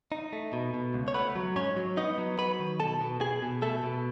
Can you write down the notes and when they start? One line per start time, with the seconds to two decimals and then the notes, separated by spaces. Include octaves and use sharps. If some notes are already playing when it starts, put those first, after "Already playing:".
0.12 D#4
0.33 A3
0.53 B2
0.74 B2
0.94 C#2
1.08 C#5
1.14 A3 B3 B4
1.36 F#3
1.56 G#2 C#4 C#5
1.77 F#3
1.97 B3 D#4 D#5
2.18 F#3
2.38 F#3 B4 B5
2.60 D#3
2.80 B2 A4 A5
3.01 B2
3.21 B2 G#4 G#5
3.42 B2
3.62 B2 A3 A4
3.83 B2